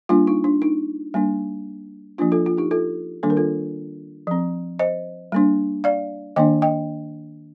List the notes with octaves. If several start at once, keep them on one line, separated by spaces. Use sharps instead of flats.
G3 A#3 D4 F4
D#4
D4
D#4
G3 A#3 D4
F3 A#3 D4 F4
F4 A4
F4
D#4 G4
F4 A4
D#3 G3 A#3 D4 A4
A#4
F4 A4
F3 C4
C5 D#5
G3 A#3 D4
D5 F5
D#3 A#3 D4 D#5 G5
D#5 G5